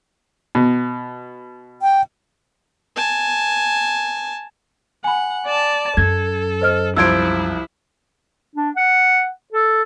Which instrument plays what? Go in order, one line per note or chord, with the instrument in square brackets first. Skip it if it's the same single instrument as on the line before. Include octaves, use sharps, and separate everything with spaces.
[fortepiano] B2
[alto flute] G5
[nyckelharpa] G#5 A5
[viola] F#5 [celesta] G#5 B5
[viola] D5 A5
[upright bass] F#2 [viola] A4 [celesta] G#6
[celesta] C5 D#5 F6
[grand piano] C2 F3 C5 [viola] E4 [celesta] E6 G#6 D7
[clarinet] D4
F#5
A4